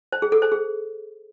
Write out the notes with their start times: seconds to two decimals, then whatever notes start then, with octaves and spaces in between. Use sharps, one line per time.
0.12 C5
0.22 G#4
0.32 A4
0.42 C5
0.52 G#4